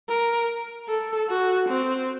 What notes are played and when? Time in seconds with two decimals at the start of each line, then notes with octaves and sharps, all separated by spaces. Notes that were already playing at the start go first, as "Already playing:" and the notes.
0.09 A#4
0.88 A4
1.29 F#4
1.69 C4